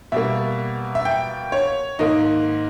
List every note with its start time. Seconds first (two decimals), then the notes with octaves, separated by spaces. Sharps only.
0.12 B2 G3 A#3 E5
0.95 E5
1.05 G5
1.52 C#5
1.99 G#2 D#3 A#3 D#5